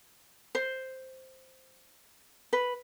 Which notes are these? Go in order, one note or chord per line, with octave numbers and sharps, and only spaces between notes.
C5
B4